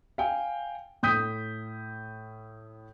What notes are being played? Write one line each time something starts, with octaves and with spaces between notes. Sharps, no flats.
F5 G5 G#5
A2 D#6 G6 B6 D#7